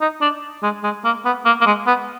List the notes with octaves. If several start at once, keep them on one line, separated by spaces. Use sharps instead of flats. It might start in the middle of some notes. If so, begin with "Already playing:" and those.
D#4
D4
G#3
G#3
A#3
B3
A#3
A#3
G#3
B3